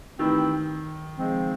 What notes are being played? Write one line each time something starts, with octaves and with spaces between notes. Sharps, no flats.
D#3 E3 A3 C4 E4 G4
C#3 F3 G#3 C4